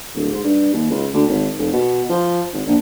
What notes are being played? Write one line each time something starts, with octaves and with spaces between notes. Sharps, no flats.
D1
G#2
G2
D#2
C#2
D2
G#1
F1
B2
F3
G#1
A#1